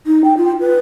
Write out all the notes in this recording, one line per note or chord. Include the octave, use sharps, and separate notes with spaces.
D#4
G5
F4
B4